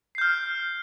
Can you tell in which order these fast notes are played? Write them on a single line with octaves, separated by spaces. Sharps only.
C7 G6 F6